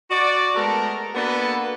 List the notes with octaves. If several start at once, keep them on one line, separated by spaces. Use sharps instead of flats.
F#4 D5
G#3 A3 B3 A4 A#4
A#3 B3 D4 F#4 A4 B4